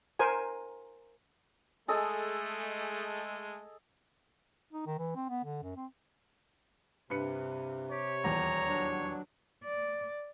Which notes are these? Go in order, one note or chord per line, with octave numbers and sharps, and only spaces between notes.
A#4 C5 G#5
G#3 A3 G#4 A4 D#5
D#4
D#3
E3
C4
B3
D3
F#2
C4
G2 C3 B4 C#7
G4 C#5
D#1 E2 A#5
F#3 D4
D5